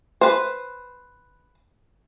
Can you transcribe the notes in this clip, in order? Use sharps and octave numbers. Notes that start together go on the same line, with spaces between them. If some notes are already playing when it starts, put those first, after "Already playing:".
B4 C5